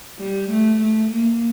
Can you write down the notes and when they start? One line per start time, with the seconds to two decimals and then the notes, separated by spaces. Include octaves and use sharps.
0.19 G3
0.50 A3
0.80 A3
1.10 A#3